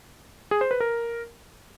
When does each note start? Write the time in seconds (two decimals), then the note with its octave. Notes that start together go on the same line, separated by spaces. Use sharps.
0.51 G#4
0.61 C5
0.71 B4
0.80 A#4